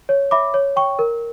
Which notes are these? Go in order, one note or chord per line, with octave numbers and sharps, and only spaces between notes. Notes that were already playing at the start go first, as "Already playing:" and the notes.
C#5
E5 B5 D6
C#5
G5 C#6
A#4